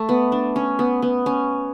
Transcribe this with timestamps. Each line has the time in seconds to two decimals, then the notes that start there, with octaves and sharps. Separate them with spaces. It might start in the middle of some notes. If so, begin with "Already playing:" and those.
Already playing: A3
0.09 B3
0.32 D4
0.56 C#4
0.79 B3
1.02 B3
1.26 C#4